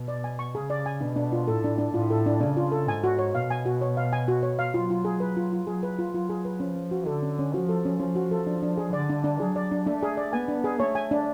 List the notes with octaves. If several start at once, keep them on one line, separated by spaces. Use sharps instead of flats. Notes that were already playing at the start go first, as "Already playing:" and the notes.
Already playing: B2
D5
G#5
C#6
C#3 G#4
D5
G#5
B2 D4
D4
F4
A2 A4
D4
D4
A2 F4
A4
D4
C#3 D4
F4
A4
G#2 G#5
F#4
C#5
B2 F5
G#5
F#4
C#5
F5
G#5
F#4
C#5
F5
F#3 F4
F4
G#4
B4
F4
F4
F#3 G#4
B4
F4
F#3 F4
G#4
B4
F3 C#4
C#4
F#4
D3 A4
C#4
C#4
F3 F#4
A4
C#4
F3 C#4
F#4
A4
D4
D4
G#4
D3 D5
D4
D4
F#3 G#4
D5
D4
A3 D4
G#4
D5
B3 G#5
D4
G#4
A3 C#5
G#5
D4